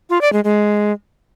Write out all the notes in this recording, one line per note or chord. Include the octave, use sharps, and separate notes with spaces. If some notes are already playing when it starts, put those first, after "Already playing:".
F4
D5
G#3
G#3